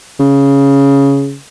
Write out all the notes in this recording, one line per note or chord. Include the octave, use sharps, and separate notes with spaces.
C#3